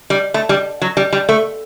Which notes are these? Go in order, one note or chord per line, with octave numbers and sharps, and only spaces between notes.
G3
A3
G3
F#3
G3
G3
A3